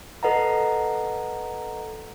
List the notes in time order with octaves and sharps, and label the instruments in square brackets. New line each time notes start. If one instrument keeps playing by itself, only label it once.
[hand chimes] A4 B4 D#5 F#5 A#5